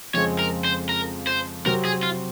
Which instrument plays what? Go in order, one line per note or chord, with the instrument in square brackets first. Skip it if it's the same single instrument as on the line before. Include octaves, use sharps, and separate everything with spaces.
[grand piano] F2 C#3 G#3 C4 [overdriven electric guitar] C#5
[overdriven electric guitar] A#4
C5
A#4
C5
[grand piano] C3 F#3 C4 F#4 [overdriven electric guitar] A#4
[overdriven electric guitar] G#4
F4